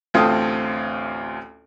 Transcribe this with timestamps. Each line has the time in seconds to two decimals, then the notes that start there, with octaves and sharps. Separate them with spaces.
0.14 A1 D2 C4 F4 A4 D#6